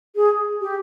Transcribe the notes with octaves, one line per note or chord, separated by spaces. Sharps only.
G#4
G4